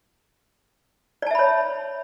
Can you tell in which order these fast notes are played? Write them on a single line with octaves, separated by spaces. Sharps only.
D5 A5 E5 B5 C#5